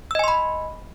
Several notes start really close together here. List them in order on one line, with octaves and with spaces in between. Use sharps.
E6 D#5 G#5 C6 B5